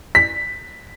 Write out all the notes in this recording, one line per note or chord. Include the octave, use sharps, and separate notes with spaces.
B6